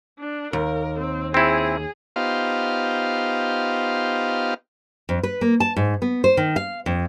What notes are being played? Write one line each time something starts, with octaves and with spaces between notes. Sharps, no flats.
D4
D#2 A#4
C4
C4 E4 G#4
B3 D#4 F4 G4 C5 F5
F2
B4
A#3
A5
G#2
B3
C5
D#3
F5
F2